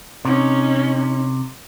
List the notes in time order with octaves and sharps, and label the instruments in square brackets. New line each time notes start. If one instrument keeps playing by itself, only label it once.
[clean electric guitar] C3 [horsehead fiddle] C#4 D#4